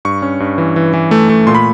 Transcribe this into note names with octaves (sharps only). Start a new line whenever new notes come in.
G2 C#6
C#4
G2
E3
E3
E3
A3
A3
A#2 C6
B5